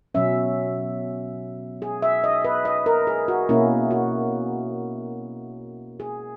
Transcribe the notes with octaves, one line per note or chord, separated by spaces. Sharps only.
B2 F#3 C#4 E5
G#4
E5
D#5
B4
D#5
A#4
G#4
F#4
B2 A#3 C#4 E4
F#4
G#4